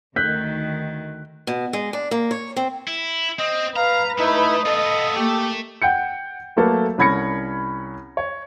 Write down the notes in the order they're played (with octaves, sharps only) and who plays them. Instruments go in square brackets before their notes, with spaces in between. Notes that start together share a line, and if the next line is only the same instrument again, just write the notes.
[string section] D2 D#3 [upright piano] F#6 G6 B6
[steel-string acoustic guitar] B2
G#3
D4
A#3
C#5
C4
[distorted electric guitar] E4
[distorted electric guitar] C4 [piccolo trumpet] D#5
[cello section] B4 [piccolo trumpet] F5 [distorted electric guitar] A#5
[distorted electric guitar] A3 [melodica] D#4 E4 [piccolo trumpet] D#6
[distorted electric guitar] B3 F4 [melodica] A4 [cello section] D#5
[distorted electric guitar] A3 [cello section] A#3 [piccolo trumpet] G4
[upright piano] F#5 G5 G6 C#7
F#3 A3 A#3 A4 B4
C2 C#4 B5 G#6 A#6 C#7
C#5